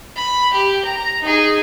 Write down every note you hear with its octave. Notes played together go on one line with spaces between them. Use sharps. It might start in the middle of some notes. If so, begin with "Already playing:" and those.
B5
G4
A#5
D#4 G#4